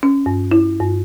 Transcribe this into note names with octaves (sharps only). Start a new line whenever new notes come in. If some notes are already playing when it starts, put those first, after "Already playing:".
C#4
G2
E4
G2